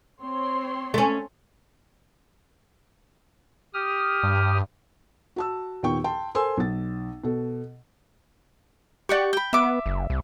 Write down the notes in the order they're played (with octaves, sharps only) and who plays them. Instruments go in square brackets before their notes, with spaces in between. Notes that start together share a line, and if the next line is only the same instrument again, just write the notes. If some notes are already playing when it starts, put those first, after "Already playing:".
[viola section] C4 C#5 C6
[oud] A3 C#4
[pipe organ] G4 D#6 F6
[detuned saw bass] G2
[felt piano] F#4 A5 E6
D#2 A#2 B3 G5 C#6
G5 A5 C6
A4 A#4 C5 G#5 C6 E6
B1 A6
B2 A4
[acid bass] G4 [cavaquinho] D5 F#5 C#6
[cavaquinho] G5 B5
[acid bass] B3 [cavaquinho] E5 D6
[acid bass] F#1
C2